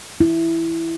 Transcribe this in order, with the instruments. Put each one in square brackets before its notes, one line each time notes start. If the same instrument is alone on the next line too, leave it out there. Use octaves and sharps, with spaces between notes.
[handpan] E4